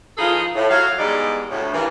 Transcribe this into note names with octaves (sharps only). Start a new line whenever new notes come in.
E3 F3 D#4 F4 G#4 A4
A2
F#3 F5
E2 G#2 G3 G#3 D#4 D5
D2 A2
G2 E3 A#3